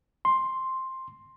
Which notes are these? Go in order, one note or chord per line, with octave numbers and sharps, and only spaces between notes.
C6